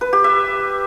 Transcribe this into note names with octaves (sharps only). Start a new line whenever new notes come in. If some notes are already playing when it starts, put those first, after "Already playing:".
B4
G4
E5